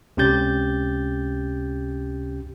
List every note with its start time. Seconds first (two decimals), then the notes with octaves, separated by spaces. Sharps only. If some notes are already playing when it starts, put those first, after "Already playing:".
0.17 C#2 C3 C#4 G4 G6 A6